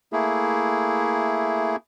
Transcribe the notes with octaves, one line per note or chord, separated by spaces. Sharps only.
A3 A#3 E4 G#4